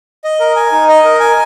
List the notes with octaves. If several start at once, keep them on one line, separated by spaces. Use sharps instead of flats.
D#5
A#4
G#5
D#4
D#5
A#4
G#5